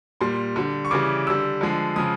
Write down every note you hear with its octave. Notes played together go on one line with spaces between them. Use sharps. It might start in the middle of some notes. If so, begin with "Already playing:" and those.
A#2 G3 C6
D3 G3
C#6
C#3 E3 G3 D6
D3 G3 E6
D3 F3 G#3
C#3 F3 G#3 D#6